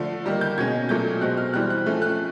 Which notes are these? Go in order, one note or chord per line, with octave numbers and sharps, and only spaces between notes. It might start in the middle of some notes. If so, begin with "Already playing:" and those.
Already playing: D3 F3 A3
D#3 G3 A#3
G6
B2 G#3 C#4 G#6
A#2 F#3 A3 G6
B2 G#3 C4 F#6
F6
E3 G3 C4 F#6
F#6
F3 A3 C#4
F#6